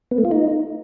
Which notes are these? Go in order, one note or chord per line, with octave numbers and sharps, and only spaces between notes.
B3
A3
F4
D#4